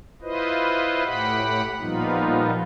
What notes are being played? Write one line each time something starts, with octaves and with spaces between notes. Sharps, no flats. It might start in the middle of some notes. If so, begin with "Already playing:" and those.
E4 F4 B4 C5 D#5
A2 G4 F#5 B5
A#2 F3 G3 B3 D#4 F4